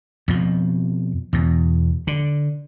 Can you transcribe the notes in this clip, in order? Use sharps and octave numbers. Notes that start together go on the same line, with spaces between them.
F2 B2 F3
E2 B2
D3